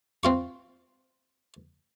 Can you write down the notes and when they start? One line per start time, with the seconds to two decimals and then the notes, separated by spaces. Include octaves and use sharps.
0.23 C4 F4 C#6